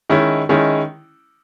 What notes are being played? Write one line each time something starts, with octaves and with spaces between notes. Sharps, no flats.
D#3 G#3 C#4 E4
D#3 G#3 C#4 E4